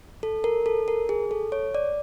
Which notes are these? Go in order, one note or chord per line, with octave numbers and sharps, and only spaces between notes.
A4
A#4
A4
A#4
G#4
A4
C#5
D5